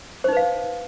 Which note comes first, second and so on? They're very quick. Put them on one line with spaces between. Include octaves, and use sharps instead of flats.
C5 D#4 B4 F5